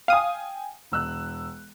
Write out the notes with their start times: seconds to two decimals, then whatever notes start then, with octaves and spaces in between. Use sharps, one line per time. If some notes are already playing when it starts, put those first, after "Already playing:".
0.08 F5 G5 G#5 D#6
0.92 E1 E6 F#6